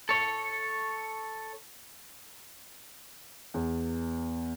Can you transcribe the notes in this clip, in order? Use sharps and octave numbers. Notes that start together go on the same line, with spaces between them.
A4 C#5
E2